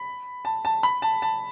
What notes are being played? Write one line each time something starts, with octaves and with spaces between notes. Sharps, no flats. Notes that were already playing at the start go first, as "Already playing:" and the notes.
Already playing: B5
A5
A5
B5
A5
A5